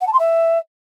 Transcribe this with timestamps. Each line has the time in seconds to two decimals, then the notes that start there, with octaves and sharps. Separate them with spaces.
0.01 F#5
0.07 A5
0.13 C6
0.19 E5